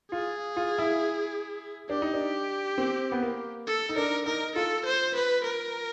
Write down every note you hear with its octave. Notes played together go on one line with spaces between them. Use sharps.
F4 G#4
F4
E4
D4 G4
D#4
D4
C4
B3
A#3
A4
D#4
D4 A#4
D#4 A#4
F4 A4
C5
B4
A#4